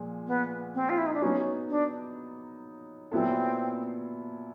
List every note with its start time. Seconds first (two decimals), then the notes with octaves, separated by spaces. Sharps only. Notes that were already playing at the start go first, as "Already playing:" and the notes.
Already playing: A#2 F3 G#3
0.27 B3
0.75 C4
0.89 F4
0.98 E4
1.06 D#4
1.14 D4
1.22 F#3 B3 C#4 D#4
1.69 D4
3.12 A#2 F#3 B3 C4 E4 A4